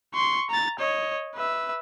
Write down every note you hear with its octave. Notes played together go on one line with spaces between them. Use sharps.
C6 C#6
A#5 A6
C#5 D#5
B4 E5